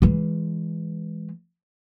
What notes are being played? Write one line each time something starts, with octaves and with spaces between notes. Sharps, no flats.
E3 G#3